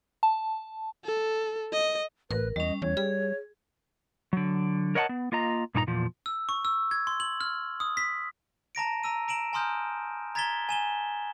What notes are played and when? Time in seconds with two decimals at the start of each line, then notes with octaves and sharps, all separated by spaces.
0.23 A5
1.05 A4
1.73 D#5
2.31 A1 A#4 B4
2.56 E2 G3 C#4 D#5
2.82 E2 C#5
2.97 G3 G#4
4.33 D3 F#3
4.95 A#4 C#5 D#5 F#5 G5 A5
5.09 B3
5.32 A#3 F4 D#5 A#5
5.75 G2 A#2 D#4 A5 A#5
5.87 E2 A#2 F3
6.26 E6
6.49 C#6
6.65 E6
6.91 G#6
7.07 C6
7.20 F#7
7.41 F6
7.80 D#6
7.97 B6
8.75 A5 A#5 A#6 D7
9.03 A#5 E6 D#7
9.28 A#5 D7 E7 F#7
9.53 G#5 A#5 C6 D#6 F6 G6
10.35 A#5 G#6 A6 B6 E7 G7
10.69 G#5 E7 G7